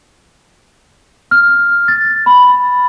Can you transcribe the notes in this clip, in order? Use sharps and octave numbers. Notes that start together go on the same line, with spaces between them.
F6
A6
B5